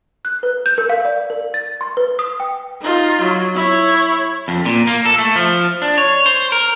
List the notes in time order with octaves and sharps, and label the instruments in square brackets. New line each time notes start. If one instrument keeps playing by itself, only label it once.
[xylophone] F#6
B4
G6
A#4
F5
D5
A#4
A6
C6
B4
D#6
G5
[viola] D#4 F4
F#3
E4 C#5
[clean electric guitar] F2
A#2
A#3
A4
A3
F3
D4
C#5
C5
A#4